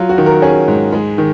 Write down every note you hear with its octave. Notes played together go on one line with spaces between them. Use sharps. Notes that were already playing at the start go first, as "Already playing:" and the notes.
Already playing: F#3 F4
F#4
D#3
A#4
C#4 G#4
G#2
G#3
D#3